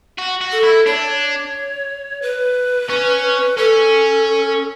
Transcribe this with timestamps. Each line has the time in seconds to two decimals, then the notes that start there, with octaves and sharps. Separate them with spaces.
0.19 F#4
0.41 F#4
0.52 A4
0.63 E4
0.86 D4 C#5
2.22 B4
2.90 C#4
3.57 C#4 A4